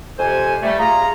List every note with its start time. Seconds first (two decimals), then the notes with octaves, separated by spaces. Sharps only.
0.19 F2 C3 C5 G#5
0.63 G3 A3
0.79 F4 G#4 A#5